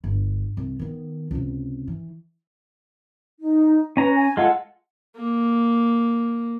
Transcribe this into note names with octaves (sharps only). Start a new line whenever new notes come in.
G1
C2
D#3 B3
C#2 C3
E3
D#4
C#4 B4 A#5
G#5
G#3 F4 A4 F#5
A#3